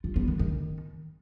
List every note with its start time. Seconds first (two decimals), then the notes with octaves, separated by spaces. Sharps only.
0.04 F4
0.16 B3
0.28 D#3
0.39 D#3